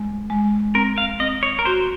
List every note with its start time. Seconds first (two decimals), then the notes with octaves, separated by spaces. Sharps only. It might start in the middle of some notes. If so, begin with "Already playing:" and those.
Already playing: G#3
0.30 G#3
0.75 C4 A#4
0.98 F5
1.20 C4 D#5
1.43 C#5
1.59 A#4
1.65 F#4 C5